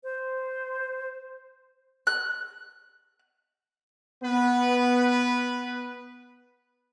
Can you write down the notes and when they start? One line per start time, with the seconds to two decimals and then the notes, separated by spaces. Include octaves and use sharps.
0.04 C5
2.07 F#6
4.23 B3 B4